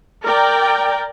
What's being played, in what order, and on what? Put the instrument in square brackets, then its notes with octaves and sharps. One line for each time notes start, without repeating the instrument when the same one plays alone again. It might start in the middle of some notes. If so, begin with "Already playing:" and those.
[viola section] A#4 D5 G5